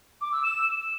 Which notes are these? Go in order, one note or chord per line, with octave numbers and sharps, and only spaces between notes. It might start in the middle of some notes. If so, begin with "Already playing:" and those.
D6
E6
E7